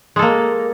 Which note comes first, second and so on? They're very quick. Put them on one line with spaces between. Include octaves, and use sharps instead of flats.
G#3 A4 A#3